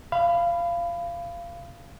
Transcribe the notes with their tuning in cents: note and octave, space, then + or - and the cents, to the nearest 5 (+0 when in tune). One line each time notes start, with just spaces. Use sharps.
F5 -20 B5 +15